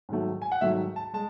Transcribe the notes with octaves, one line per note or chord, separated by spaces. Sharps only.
G#2 D#3 F#3 A3
G#5
F#5
G#2 D#3 F#3 A3 E5
A5
G#3 A5